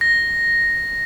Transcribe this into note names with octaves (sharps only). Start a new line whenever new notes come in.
A#6